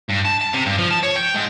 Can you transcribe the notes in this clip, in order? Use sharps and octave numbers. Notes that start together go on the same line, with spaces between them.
G2
A5
A5
C3
G2
F3
A5
C#5
G5
G#2